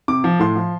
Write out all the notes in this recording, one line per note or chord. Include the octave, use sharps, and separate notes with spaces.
C3 D6
F3
A2 C6
F3